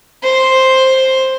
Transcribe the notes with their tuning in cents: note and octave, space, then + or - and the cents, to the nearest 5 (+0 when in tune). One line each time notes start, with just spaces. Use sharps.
C5 +5